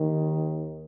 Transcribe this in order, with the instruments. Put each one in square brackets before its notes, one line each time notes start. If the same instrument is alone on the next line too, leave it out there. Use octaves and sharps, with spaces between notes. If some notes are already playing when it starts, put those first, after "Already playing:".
Already playing: [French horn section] D#2 D#3